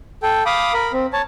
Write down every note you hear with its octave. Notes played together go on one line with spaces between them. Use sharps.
A4 G5
F5 B5 D6 D#6
A#4 B5
C4
C#5 A5